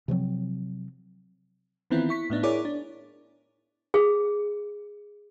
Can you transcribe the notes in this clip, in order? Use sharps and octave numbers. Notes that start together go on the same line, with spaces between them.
C3 F3 F#3 C4
D#3 E3 B3 C4 E4 F4
E4 C#6 B6
A2 B3 D4 D#4
E4 G#4 A#4 C#5 D5 D6
D4
G#4